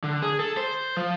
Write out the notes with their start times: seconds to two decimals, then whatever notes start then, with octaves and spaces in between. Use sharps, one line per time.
0.04 D3
0.23 G#4
0.39 A4
0.57 C5
0.97 F3